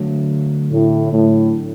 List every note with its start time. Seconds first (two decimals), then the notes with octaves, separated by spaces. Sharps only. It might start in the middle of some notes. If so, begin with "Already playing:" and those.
Already playing: D2 D3 F#3
0.72 A2
1.12 A2